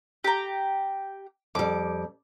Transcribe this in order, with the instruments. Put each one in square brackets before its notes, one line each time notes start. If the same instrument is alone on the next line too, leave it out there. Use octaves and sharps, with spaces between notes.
[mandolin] G4 A#5
[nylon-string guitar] F2 G3 [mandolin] D6